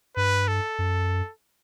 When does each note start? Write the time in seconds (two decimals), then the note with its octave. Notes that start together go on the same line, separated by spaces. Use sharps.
0.16 G2 B4
0.48 A4
0.79 F#2